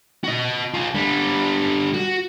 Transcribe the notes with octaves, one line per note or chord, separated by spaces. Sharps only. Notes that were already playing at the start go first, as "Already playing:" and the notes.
F#4 D#5
F4 G#4
D3 G3
F#4